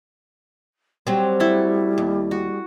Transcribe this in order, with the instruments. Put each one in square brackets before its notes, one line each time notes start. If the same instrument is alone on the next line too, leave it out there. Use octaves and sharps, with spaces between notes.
[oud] F#3 C4 [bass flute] G3
[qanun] A3 E4
[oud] D#2
[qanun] F#4